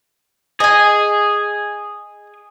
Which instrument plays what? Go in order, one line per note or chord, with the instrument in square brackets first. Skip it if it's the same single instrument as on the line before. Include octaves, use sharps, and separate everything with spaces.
[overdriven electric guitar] G#4 [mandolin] D#5 G#5